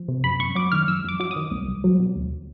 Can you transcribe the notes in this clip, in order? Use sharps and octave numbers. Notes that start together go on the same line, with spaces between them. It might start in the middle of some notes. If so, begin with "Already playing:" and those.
Already playing: F3
C3
F#2 B5
F#2 C#6
F#3 D6
D#3 F6
F#2 E6
F#2 D6
F#3 D6
D#6
D#3
C2
C2
F#3
B2
D2